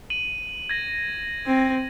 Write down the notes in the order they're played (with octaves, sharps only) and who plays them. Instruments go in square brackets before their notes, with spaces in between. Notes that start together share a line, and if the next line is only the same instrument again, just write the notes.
[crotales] D#7 F#7
G#6 A#6
[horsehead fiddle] C4